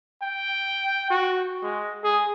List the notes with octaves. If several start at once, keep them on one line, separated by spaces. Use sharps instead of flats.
G5
F#4
G#3
G#4